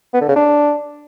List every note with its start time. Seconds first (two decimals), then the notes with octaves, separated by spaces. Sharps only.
0.14 B3
0.21 D3
0.29 C#3
0.36 D4